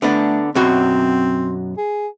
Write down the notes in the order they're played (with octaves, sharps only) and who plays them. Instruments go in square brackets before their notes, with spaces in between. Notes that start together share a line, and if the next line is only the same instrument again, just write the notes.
[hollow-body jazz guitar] D3 B3 D4 [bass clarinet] A3
[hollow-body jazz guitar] F#2 B2 F#4 [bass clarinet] C4
[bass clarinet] G#4